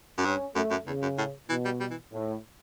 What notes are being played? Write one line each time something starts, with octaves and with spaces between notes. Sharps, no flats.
F#2
G2 C#4
F#2 A3
F#2
E2 C#3
F#2
A2
B2 E3
G3
G3
E3
A2